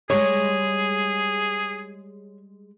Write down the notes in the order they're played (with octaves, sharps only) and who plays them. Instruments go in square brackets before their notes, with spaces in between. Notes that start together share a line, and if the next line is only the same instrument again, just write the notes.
[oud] G3 G#3 [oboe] G#4 [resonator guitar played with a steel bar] C#5